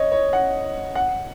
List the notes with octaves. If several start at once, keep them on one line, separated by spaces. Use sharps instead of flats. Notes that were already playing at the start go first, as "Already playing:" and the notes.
Already playing: C#5 D#5
C#5
F#5
F#5